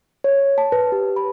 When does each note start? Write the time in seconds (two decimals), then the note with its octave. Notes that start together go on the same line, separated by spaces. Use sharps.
0.24 C#5
0.58 A5
0.72 B4
0.92 G4
1.16 B5